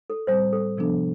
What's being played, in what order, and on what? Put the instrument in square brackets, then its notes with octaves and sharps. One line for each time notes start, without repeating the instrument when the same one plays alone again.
[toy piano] A4
[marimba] A2 G3 C4 [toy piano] C5
[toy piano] A4
[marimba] C3 F3 B3 D4 A4